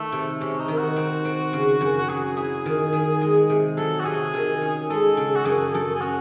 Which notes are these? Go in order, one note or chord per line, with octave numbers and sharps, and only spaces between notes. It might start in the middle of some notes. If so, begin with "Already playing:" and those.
Already playing: D#3 A3
C3
C3 C#4
D#4
D#3
F#4
C4
C4
C#3
F#2
F#4
F#3 G#4
E4 G#4
D#3
D#3
G#3
C3
F#3 A4
F#4
C3 G#4
D#3
C#4
G#3 A4
C#3
F#4
F#2 G#4
F#2 A4
G#4
C#4 F#4